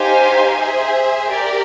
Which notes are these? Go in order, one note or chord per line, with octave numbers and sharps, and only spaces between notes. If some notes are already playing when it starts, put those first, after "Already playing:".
Already playing: D#4 G4 C5 F5 G#5
G#4 C5 E5
G4 A#4 D5